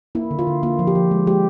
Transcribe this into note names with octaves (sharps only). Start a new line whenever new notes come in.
A#3 E4
D3
F4
D3
A#3 F4
F3
G4
F3
G#3
G#3 G4